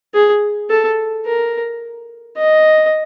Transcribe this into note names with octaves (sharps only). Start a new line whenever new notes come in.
G#4
A4
A#4
D#5